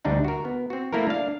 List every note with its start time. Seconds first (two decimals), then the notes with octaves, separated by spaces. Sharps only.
0.05 D2 G3 D4 D#4 F#5
0.25 F#4 A#4
0.45 B3
0.70 C4 F#4
0.93 A3 A#3 E4 A4 A#4
1.07 D4 F5